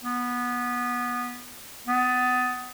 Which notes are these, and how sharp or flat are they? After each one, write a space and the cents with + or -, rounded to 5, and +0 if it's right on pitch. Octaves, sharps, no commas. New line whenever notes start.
B3 -15
B3 +25